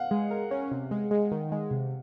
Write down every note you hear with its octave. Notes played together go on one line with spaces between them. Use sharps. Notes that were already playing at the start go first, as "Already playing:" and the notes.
Already playing: F5 F#5
G#3
A#4
C#4
C3
G#3
G#3
D#3
G#3
C3